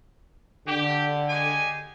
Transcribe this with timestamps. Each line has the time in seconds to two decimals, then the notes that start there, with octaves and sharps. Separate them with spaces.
0.67 D3 G4
1.29 G#3 G4 G#5